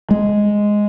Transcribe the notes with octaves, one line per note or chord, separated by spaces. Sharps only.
G#3